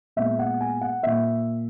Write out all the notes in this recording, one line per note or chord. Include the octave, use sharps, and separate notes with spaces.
A#2 G#3 B3 E5
F#5
G#5
F#5
A#2 A#3 E5